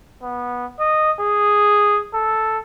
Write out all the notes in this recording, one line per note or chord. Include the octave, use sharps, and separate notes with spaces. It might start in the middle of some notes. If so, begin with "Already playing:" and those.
B3
D#5
G#4
A4